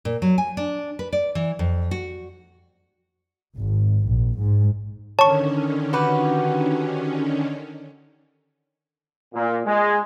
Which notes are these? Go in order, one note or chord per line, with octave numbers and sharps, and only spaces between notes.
A#2
F#3
G#5
D4
B4
D5
E3
F2
F#4
G#1
A#1
G#2
D3 D#3 C#4 C#5 A5 C#6
F#4 G4 B4
A#2
G#3